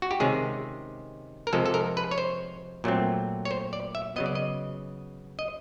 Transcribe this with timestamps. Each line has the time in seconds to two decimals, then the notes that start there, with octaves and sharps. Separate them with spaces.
0.02 F#4
0.11 G4
0.20 C3 D#3 G#3 C#4 G#4
1.47 A#4
1.53 C3 F3 G#3 A4
1.66 A4
1.74 A#4
1.97 B4
2.11 C#5
2.18 C5
2.84 A#2 F#3 A3 C4
3.45 C#5
3.51 C5
3.73 D5
3.95 E5
4.16 C#3 F#3 B3 D#5
4.26 D5
4.35 D#5
5.39 D#5